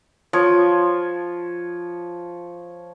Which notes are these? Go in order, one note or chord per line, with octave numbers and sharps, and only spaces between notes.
F3 C#5